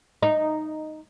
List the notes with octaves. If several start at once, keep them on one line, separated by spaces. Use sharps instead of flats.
D#4